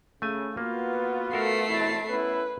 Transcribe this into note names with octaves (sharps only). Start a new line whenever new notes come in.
C#3 A3 G#5
A#3 B3 F4 F#4 B4
A3 A4 A#4 F5 C7
E2 B2 C4 E4 A5
B3 C#4 E4 B4